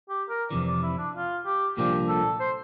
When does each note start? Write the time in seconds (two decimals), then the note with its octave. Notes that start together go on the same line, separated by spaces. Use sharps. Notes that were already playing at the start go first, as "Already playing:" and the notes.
0.09 G4
0.30 A#4
0.51 F2 C3 E3 D5
0.67 D5
0.83 E4
0.98 D4
1.14 F4
1.46 G4
1.77 C2 A#2 F3 A#3 D4 G4
2.08 A4
2.40 C5